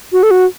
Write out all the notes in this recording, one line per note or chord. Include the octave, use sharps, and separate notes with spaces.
F#4
A4
F#4